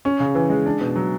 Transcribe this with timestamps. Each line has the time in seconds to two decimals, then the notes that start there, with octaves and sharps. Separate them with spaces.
0.05 C#4
0.20 C#3
0.35 E3
0.50 G#3
0.66 D4
0.81 B2
0.96 F#3